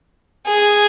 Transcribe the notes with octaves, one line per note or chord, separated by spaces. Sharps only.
G#4